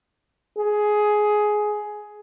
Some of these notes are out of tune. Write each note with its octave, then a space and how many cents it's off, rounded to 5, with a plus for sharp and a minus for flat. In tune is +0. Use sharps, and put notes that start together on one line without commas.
G#4 +15